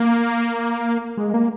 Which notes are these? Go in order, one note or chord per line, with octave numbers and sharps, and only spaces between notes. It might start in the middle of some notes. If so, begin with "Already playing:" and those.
Already playing: A#3
G#3
A#3